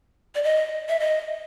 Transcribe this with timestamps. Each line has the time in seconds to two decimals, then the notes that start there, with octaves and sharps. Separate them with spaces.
0.35 D5
0.43 D#5
0.89 E5
1.00 D#5